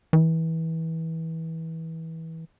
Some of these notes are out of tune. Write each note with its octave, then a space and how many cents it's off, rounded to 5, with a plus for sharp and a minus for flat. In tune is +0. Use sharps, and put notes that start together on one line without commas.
E3 -25